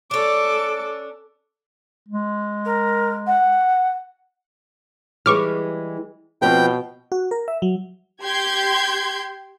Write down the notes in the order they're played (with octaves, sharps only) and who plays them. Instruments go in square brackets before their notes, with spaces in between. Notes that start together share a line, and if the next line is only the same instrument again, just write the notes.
[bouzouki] C#4 D4 [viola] A4 D6
[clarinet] G#3
[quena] A#4
F#5
[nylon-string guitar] E3 G3 G#3 [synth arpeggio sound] C#6 D6 F6
[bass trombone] B2 [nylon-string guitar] F3 C4 B4 [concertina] G5
[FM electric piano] F#4
A#4
E5
F#3
[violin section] G4 C6 G6 G#6